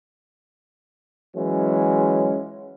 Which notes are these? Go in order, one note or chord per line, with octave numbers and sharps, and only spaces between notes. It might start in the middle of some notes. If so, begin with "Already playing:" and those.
E3 F#3 G#3 C#4